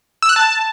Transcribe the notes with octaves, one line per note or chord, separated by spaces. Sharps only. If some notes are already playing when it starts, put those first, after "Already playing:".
E6
F#6
A5